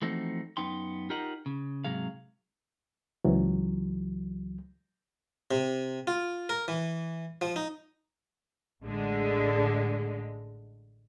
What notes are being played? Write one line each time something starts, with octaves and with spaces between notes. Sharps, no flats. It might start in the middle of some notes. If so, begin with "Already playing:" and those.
E3 F3 A3 C4 D#4 F#4
F#2 B3 D#4 G5 C6
D#4 F4 G4 A#4 D#5 F#5
C#3
G#2 C3 F#3 G#4 F5
C#2 E3 F#3
C3
F4
A#4
E3
F3
D#4
A1 D3 G#3